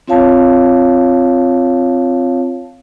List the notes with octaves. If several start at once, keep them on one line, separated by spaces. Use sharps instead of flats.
C4 F4 C#5 F5 A5